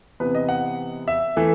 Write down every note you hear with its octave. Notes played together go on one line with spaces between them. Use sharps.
C3 E3 B3 B4
D#5
F#5
E5
E3 A3